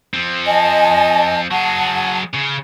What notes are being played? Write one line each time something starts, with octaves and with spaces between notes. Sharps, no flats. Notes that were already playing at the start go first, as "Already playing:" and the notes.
F3 C4
D#5 G#5 A5
F#3 G#4 F#5 A5
C#3